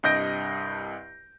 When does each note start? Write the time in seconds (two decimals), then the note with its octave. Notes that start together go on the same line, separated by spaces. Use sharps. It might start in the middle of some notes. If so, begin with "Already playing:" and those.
0.03 C2 G2 D#5 G6 A#6 D7